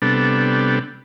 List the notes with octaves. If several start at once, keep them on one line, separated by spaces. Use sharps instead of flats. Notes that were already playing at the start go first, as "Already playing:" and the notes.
C3 G3 B3 D4 A4